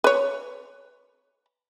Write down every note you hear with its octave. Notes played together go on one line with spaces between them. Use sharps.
B4 C#5